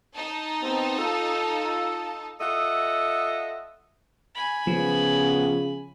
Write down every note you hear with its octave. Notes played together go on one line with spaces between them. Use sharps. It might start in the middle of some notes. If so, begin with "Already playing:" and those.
D#4 A5
B3 C4
F4 A4
F4 A4 D#5 E5 F#5
G#5 B5
C#3 F3 B3